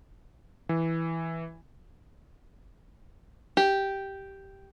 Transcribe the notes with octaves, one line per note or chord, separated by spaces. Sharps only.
E3
G4